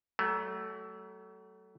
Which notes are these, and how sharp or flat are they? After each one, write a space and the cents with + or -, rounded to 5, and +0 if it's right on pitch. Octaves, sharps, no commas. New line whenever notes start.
F#3 +35 A3 +0